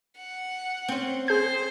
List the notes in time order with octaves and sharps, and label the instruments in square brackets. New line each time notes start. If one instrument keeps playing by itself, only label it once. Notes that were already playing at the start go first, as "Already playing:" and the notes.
[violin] F#5
[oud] C4 C#4
[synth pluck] G#4 G6 [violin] C5